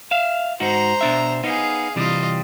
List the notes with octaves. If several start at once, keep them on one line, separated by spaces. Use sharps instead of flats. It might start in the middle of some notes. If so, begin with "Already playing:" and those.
E5 F5
G#2 D#4 F#4 C5 A#5
B2 D4 E5
B3 D#4 G#4 F5
C3 E3 G3 F4 D#5